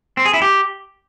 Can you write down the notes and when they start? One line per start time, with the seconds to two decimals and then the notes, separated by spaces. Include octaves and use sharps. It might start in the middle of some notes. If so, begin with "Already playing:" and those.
0.17 C4
0.25 G#4
0.34 E4
0.42 G4